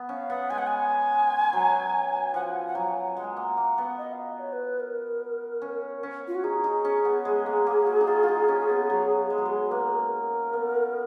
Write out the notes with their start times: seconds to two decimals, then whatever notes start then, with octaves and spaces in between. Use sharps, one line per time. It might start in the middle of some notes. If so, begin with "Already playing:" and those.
Already playing: B3
0.09 C#4 F5
0.29 B3 F#5
0.50 G#3 G#5
0.58 F#5
0.67 G#5
1.53 F#3
2.34 F3 F#5
2.43 G#5
2.51 F#5
2.60 G#5
2.67 F#5
2.75 F#3 G#5
2.84 F#5
2.92 G#5
3.01 F#5
3.09 G#5
3.16 G#3 F#5
3.24 G#5
3.33 A#3 F#5
3.57 A#3
3.78 B3
3.98 D#5
4.13 F5
4.26 D#5
4.40 C#5
4.53 B4
4.80 A#4
5.62 C#4
6.03 C#4
6.28 F4
6.35 F#4
6.44 D#4 G#4
6.64 D#4
6.85 C#4
7.05 B3
7.25 G#3
7.46 A#3
7.67 A#3
7.87 F#4
8.01 D#4
8.07 F4
8.23 F4
8.28 D#4
8.48 C#4
8.69 B3
8.90 F#3
9.30 G#3
9.38 F#3
9.46 G#3
9.71 A#3 B4
9.81 A#4
9.90 G#4
10.00 A#4
10.53 B3